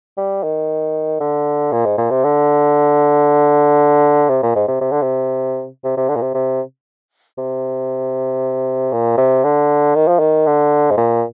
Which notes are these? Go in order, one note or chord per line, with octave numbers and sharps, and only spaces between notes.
G3
D#3
D3
A#2
G#2
A#2
C3
D3
C3
A#2
G#2
C3
C3
D3
C3
C3
C3
D3
A#2
C3
C3
C3
A#2
C3
D3
D#3
F3
D#3
D3
G#2
A#2